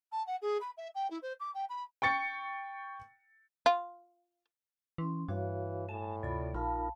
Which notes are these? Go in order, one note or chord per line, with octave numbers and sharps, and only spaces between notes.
A5
F#5
G#4
B5
E5
G5
E4
C5
D6
G5
B5
G5 C#6 A6 C#7
F4
E3 C#4 C6
G2 E3 F#4 C#5 F5
A2 G#5 A5
D2 C3 F4 D5 B5
A#1 D#4 F4 A#4 F5 A5 B5